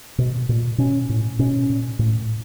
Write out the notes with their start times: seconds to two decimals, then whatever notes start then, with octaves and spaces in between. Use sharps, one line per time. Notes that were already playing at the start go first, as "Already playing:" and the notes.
0.18 B2
0.49 A#2
0.78 B2 C#4
1.09 A2
1.39 B2 C#4
1.70 A#2
1.99 A2